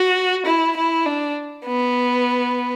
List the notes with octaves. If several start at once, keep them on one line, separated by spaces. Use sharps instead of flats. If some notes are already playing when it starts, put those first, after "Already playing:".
Already playing: F#4
E4
E4
D4
B3